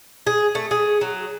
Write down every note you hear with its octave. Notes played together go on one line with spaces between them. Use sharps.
G#4
A3
G#4
F#3